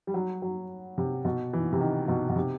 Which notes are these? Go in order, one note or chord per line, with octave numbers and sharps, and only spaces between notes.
G3
F#3
F#3
C3
B2
E3
C3
D#3
B2
B2
C3